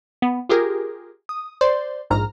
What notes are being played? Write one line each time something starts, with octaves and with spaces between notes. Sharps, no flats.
B3
F4 G4 G#4 A#4
D#6
C5 D5 C6
A#1 G#2 A#5 F6